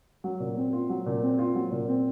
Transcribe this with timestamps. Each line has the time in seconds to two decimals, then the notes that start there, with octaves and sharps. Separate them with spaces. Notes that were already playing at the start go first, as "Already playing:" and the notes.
0.24 F#3
0.40 A#2
0.57 C4
0.73 F4
0.90 F#3
1.06 A#2
1.22 C4
1.39 F4
1.55 F#3
1.71 A#2
1.88 C4